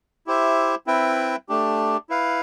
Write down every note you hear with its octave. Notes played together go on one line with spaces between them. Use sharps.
E4 G4 C5 E5
C4 E4 B4 E5 G5
A3 D4 G4
E4 B4 F5